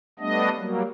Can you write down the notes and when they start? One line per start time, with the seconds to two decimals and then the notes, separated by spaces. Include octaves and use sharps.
0.19 G3 A3 B3 D4 D#5
0.55 F#3 G3 A#3